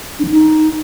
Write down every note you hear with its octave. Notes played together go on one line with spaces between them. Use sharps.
D4
F3
D#4